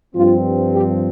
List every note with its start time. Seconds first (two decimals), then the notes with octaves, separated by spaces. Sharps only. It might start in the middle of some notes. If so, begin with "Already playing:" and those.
0.15 G2 F3 C4 F4
0.74 G4